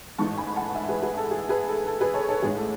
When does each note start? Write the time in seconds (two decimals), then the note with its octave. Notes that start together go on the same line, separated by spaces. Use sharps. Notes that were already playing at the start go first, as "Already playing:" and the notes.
0.18 A1 G#2 E3 G#3 A5 C#6
0.37 G#5 B5
0.56 F#5 A5
0.75 E5 G#5
0.88 G#4 B4
1.02 G#4 B4
1.17 A4
1.31 G#4
1.49 G#4 B4
1.68 A4
1.86 A4
2.01 G#4 B4
2.14 A4 C#5
2.29 A4 C#5
2.42 A1 A2 G#3 G#4
2.57 A4